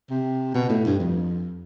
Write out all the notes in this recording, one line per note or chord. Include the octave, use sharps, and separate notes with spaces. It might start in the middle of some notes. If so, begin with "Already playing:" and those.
C3
B2
A2
G2
F2